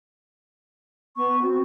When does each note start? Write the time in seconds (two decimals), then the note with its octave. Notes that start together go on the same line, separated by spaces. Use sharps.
1.16 B3 C#6
1.42 C4 F#4